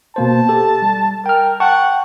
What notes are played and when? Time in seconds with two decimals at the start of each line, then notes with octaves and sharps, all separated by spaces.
0.16 B2 A#3 C5 A5
0.49 G4 A4
0.82 G3
1.26 A#4 G5 F6
1.60 F#5 G5 A5 C#6